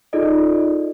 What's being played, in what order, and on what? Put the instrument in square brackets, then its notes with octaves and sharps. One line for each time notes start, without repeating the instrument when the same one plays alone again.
[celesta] D#4 F4 G#4 A4 D5 D#5